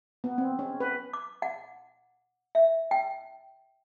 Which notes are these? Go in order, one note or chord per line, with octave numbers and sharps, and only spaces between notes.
B3
C4
C#4
B4
D6
F#5
E5
G5